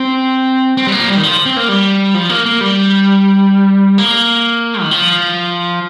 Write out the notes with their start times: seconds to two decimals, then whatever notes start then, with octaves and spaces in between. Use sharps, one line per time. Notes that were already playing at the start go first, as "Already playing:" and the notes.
Already playing: C4
0.77 C4
0.88 G3
0.92 A#3
1.00 F3
1.07 G3
1.17 D#3
1.23 F3
1.46 C4
1.57 A#3
1.69 G3
2.14 F3
2.29 A#3
2.46 A#3
2.61 G3
3.98 A#3
4.82 D#3
4.91 F3